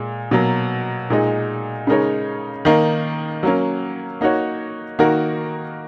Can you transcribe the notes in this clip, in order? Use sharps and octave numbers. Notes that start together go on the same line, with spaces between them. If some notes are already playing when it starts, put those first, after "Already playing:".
Already playing: A#2 G#3
B2 F#3 A#3
A#2 G#3 D#4
C#3 G#3 D#4 A#4 C#5
D#3 A#3 D#4
F#3 A#3 C#4
A#3 D#4 F#4 C#5
D#3 A#3 D#4 F#4 A#4